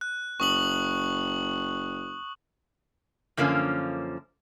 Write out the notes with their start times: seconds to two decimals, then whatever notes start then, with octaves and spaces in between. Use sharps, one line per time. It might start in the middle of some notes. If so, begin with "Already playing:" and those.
0.01 F#6
0.40 F#1 C#6 D#6 F#7
3.37 F#2 D3 F3 A#3 C#4